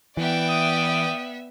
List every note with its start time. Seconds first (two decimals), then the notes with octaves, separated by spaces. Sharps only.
0.17 E3 B3 D5 E5 G5
0.49 D#6